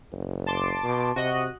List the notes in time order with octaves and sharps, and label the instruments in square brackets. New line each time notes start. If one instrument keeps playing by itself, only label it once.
[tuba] F#1
[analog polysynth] A5 C6 D6
[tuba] B2
[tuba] C3 [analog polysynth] F#4 D#5 F#6